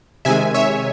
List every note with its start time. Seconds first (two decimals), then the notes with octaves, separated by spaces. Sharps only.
0.25 C3 D#3 G#3 E5 G#5
0.54 C#5 E5